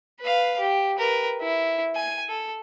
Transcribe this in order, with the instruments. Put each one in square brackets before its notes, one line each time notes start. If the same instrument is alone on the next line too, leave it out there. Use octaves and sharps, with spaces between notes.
[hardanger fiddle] B4 F5
G4
A#4 B4
E4
G#5
A4